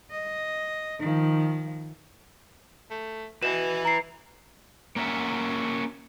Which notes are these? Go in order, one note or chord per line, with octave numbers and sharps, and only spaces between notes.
D#5
D#3 F3
A3
B2 B4 E5 E7
E4 A#5 C7
A#3 C#4 F#4 E5